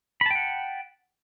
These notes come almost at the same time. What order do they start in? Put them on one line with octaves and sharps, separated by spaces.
B5 A5 G5 F#5